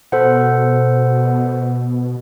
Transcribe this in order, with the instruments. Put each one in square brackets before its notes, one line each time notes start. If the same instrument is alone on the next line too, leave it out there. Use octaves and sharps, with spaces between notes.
[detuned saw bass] B2 [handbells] A4 C5 F#5